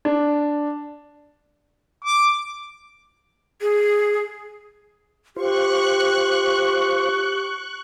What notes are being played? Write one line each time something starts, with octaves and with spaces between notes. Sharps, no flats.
D4
D6
G#4
F4 G4 C5 C#6 F#6